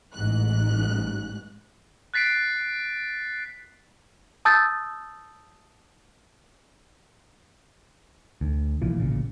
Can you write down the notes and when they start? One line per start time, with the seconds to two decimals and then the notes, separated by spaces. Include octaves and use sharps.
0.13 A1 G#2 F#6
2.14 F#6 A6 B6 C7 D7
4.45 A5 D#6 E6 G6 A6
8.41 D2
8.82 C2 A#2 E3 F3
8.99 A1 A#2 C#3